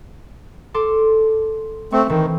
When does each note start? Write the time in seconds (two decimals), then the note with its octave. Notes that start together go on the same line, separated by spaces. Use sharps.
0.74 A4 C6 D6
1.92 A3 C4 C#6
2.10 D#3 E3 A3 C4